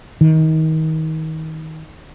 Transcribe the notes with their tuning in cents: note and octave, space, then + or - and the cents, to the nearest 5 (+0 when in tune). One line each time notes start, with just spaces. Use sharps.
D#3 +30